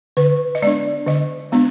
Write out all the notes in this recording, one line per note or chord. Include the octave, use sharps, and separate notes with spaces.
D3 B4
D#5
G#3 B3 D4 D5
D3 D#5
G#3 B3 D4